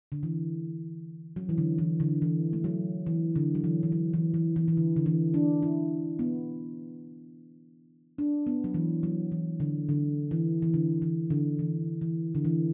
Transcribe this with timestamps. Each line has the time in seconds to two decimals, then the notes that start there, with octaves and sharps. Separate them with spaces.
0.12 D3
0.23 E3
1.36 F#3
1.49 E3
1.58 D3
1.79 E3
2.00 D3
2.22 E3
2.53 A3
2.64 F#3
3.06 E3
3.36 D3
3.55 F#3
3.64 E3
3.83 E3
3.92 F#3
4.13 E3
4.34 E3
4.56 E3
4.68 E3
4.77 D3
4.96 D3
5.06 E3
5.34 D4
5.62 E4
6.19 B3
8.18 D4
8.47 B3
8.64 F#3
8.74 E3
9.03 F#3
9.32 E3
9.60 D3
9.89 D3
10.31 E3
10.62 E3
10.74 D3
11.02 E3
11.30 D3
11.59 E3
12.01 E3
12.35 D3
12.45 E3